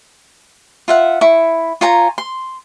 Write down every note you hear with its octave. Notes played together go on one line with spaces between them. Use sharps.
F4 E5 F#5
E4 C#6
F4 C#5 G#5 A#5
C6